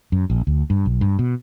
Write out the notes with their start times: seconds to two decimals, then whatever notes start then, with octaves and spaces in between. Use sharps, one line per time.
0.12 F#2
0.30 A#1
0.47 D2
0.70 G2
0.86 B1
1.01 G2
1.19 B2